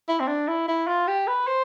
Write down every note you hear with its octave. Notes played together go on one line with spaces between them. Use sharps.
E4
C4
D4
E4
E4
F4
G4
B4
C5